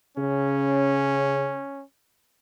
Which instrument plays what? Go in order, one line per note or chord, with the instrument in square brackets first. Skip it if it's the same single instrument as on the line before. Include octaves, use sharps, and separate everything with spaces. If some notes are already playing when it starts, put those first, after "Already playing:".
[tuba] C#3 [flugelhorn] C#4